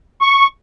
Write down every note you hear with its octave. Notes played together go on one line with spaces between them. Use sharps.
C#6